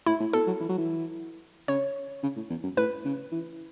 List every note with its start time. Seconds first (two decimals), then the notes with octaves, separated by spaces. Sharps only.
0.06 A2 E4
0.20 A2
0.33 B2 A4
0.47 F#3
0.60 E3
0.69 F#3
0.78 E3
1.68 C#3 C#5
2.23 C#3
2.36 A2
2.50 E2
2.63 F#2
2.77 A2 B4
3.04 C#3
3.32 E3